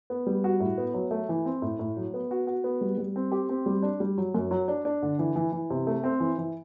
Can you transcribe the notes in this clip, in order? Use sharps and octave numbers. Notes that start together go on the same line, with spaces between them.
B3
G3
F#4
A2
B3
F#3
A3
E3
C4
A2
A2
F#3
B3
F#4
F#4
B3
G3
G3
C4
G4
C4
G3
D4
G3
F#3
F#2
F#3
D4
D4
D3
E3
E3
E3
C3
A3
C4
E3
E3